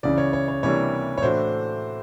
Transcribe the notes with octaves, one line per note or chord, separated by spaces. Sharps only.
C#2 C#3 E3 D5
C#5
C#5
C#5
C3 E3 G3 A#3 D4 C#5
C#5
A2 E3 A3 D4 F#4 C5